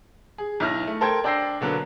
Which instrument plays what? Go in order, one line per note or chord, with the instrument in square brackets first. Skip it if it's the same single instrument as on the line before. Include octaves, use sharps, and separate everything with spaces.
[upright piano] G#4
B1 E4 F6 A#6
A3
A4 A#4 C5 G5 G#6
D4 D5 G5 E6 A#6 C7
B2 D3 F#3 A#3 B3